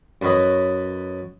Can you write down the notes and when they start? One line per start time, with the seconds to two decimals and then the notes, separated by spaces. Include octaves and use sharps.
0.22 F#2 F#4 B4 C#5 D#5